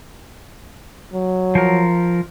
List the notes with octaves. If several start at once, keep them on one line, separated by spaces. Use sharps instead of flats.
F#3
F3 A#4